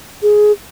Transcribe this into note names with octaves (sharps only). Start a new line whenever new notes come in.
G#4